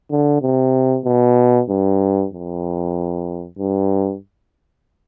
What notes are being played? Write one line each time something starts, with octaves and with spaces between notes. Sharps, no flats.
D3
C3
B2
G2
F2
G2